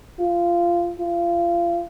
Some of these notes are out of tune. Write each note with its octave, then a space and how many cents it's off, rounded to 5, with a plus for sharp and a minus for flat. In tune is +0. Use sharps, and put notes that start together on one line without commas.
F4 -15
F4 -30